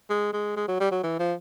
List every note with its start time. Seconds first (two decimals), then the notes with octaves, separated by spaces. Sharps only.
0.10 G#3
0.33 G#3
0.56 G#3
0.68 F#3
0.80 G3
0.91 F#3
1.03 E3
1.19 F3